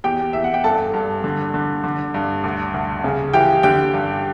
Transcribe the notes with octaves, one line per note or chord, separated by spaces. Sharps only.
E2 G4 G5
E2 E5
F#5
G5
G2 A4 A5
G2
D3
D3
D3
G2
D2
D2
C#3
E3 G4 G5
D3 G4 G5
G2